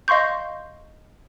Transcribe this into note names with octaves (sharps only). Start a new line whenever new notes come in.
D#5 F5 C6 C#6 G6